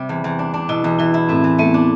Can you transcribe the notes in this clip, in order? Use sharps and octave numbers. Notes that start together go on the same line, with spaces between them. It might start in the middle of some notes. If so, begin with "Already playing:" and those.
Already playing: C3 G3
E2
E2
D4
D4
B2 E4
E2
E3 E4
E4
A2 C4
E3
A3 B3
D4